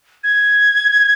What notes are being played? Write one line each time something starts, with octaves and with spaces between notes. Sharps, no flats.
G#6